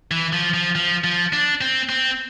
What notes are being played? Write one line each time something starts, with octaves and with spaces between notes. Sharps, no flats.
E3
F3
F3
F3
F3
D4
C4
C4